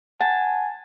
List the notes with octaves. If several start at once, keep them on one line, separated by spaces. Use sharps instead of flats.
F#5 G#5 A5